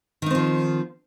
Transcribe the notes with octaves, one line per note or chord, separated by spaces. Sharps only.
D#3 F3 C4 D#4